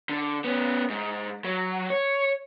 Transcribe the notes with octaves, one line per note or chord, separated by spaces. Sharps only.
D3
B3 C#4
G#2
F#3
C#5